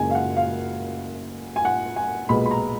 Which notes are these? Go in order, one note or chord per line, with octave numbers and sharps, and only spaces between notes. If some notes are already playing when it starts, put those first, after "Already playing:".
Already playing: F#1 F#2 C#3 G#3 G#5
F5
F#5
F5
G#5
F#5
G#5
B1 A#2 G#3 B3 B5
B5
A#5